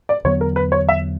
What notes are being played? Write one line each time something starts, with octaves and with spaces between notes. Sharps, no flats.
D5
E2 D3 F#3 B3 C#5
A#4
B4
C#5
E5